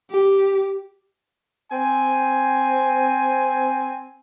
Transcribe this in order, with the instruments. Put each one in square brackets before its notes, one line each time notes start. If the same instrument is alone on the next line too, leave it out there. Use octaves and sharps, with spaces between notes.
[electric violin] G4
[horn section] C4 G#5